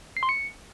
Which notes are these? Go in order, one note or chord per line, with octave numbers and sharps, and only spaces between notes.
C7
C6
C#7